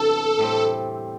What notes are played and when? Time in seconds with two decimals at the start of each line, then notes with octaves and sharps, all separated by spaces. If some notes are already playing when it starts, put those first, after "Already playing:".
Already playing: E2 C3 F#3 B3 D4 A4
0.38 A2 G3 C4